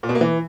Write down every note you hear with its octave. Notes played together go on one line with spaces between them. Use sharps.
A#2
B2
A#3
E3